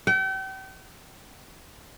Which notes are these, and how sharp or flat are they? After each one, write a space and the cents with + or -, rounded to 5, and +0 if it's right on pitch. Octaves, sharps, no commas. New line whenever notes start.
G5 -40